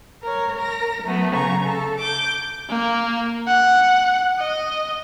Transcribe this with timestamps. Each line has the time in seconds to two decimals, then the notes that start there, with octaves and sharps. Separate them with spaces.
0.23 A#4 C#5
0.57 A#4 A#6
1.04 F#3 A3 B3
1.35 C#3 A#5 C#6
1.65 A4
1.97 D6 G6
2.69 A#3
3.47 F#5
4.39 D#5